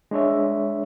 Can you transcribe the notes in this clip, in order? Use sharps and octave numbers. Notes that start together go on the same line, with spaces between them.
G#3 D4 C#5 E5